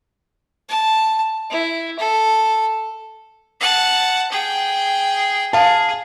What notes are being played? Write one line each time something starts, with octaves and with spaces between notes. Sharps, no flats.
A5
E4
A4
F#5 A5
G#4 G5
G#4 F5 A5